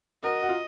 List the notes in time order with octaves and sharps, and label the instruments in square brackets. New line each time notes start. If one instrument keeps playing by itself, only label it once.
[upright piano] F#4 A#4 [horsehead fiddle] D#5
[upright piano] F#4
F4